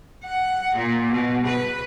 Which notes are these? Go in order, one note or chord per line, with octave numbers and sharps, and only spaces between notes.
F#5
A#2
B2
B4